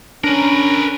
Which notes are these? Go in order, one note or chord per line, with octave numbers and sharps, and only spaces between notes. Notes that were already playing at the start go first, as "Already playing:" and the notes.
C#4 D4 A#4 B4